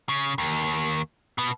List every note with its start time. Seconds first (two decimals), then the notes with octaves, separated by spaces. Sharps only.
0.09 C#3
0.38 D#2
1.38 B2 B3